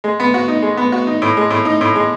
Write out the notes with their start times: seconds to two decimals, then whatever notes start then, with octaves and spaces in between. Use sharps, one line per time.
0.04 G#3
0.20 B3
0.34 F#4
0.48 D#4
0.63 G#3
0.77 B3
0.92 F#4
1.07 D#4
1.22 A2
1.37 G#3
1.50 A2
1.65 D#4
1.81 A2
1.96 G#3